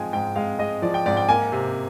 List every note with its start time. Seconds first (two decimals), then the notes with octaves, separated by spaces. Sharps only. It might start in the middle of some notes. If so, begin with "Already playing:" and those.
Already playing: G#2 F3 G#3 F5 G5 G#5
0.13 G#2 G5
0.36 G#3 F5
0.59 G#3 D#5
0.82 F3 D5
0.94 G5
1.06 G#2 D5
1.17 G5
1.28 A#3 G#5
1.52 C3